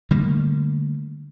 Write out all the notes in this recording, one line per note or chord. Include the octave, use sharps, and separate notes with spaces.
D3 G3 A3 A#3